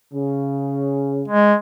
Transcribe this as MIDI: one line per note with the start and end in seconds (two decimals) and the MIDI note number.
0.13 1.23 49
1.28 1.55 56